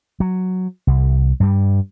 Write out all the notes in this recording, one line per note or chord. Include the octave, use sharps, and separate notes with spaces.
F#3
C2
G2 G3